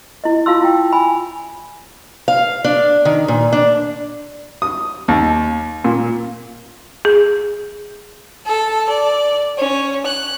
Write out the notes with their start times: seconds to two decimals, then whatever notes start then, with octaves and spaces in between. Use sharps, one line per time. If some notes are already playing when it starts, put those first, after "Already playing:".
0.24 E4 D#5
0.46 F4 F5 A5 C6 E6
0.62 E4 G5
0.92 G#5 B5
2.28 F5
2.64 D4
3.05 D#3
3.28 A#2
3.53 D4
4.62 D#6
5.08 D#2
5.85 A#2
7.05 G#4
8.46 A4
8.88 D5
9.57 C#4
10.04 F#6